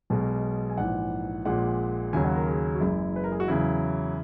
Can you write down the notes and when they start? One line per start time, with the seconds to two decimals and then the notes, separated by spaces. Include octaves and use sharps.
0.10 B1 B2 G#3
0.70 G#5
0.77 A#1 G#2 E3 F#5
1.45 A#1 A#2 G#3 F#5
2.13 D#2 C#3 F#3 G#5
2.25 F#5
2.35 A#4
2.47 G#4
2.75 F#4
2.80 F#1 F#2 E3 G#3 E4
3.16 B4
3.24 A#4
3.32 G#4
3.40 F#4
3.48 E2 C#3 F#3 E4